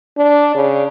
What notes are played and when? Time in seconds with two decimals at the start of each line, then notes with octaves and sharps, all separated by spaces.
0.18 D4
0.55 C#3